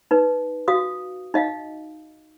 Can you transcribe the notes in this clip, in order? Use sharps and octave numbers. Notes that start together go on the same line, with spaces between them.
D#4 B4
F#4 F5 D#6
D#4 D#5 F5